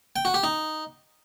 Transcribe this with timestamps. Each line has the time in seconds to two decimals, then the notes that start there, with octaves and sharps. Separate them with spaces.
0.16 G5
0.25 F#4
0.34 G4
0.44 D#4